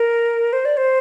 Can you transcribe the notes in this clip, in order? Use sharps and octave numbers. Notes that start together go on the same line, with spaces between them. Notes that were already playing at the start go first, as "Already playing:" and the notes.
Already playing: A#4
C5
D5
C5